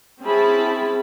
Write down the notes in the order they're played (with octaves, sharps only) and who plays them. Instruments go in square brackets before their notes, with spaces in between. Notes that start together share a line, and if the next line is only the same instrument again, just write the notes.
[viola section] C4 C#4 E4 G#4 A5 B5